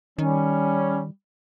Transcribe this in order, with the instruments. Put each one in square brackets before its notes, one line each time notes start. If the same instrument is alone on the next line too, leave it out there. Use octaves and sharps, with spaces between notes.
[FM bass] D#3 [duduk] G3 [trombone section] C#4